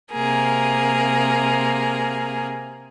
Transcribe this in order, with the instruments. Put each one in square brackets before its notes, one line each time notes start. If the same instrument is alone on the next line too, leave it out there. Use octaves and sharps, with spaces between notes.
[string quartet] C3 A#3 G#4 A#4